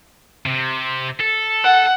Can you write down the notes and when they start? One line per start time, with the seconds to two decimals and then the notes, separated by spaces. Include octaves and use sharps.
0.46 C3
1.20 A4
1.64 F#5